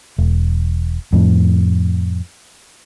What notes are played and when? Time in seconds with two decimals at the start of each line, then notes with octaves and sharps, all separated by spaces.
0.18 E1
1.13 F2 A2